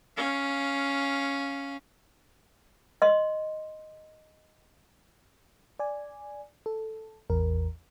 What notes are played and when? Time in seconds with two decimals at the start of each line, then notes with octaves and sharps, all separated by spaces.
0.17 C#4 F5
3.02 D#5 C6
5.79 D5 G#5
6.66 A4
7.30 A1 E2 A#4